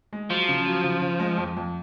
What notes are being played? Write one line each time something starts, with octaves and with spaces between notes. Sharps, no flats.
G#3
F3 F#3
C#3
F#3
C#3
C#3
G#3
F2
F2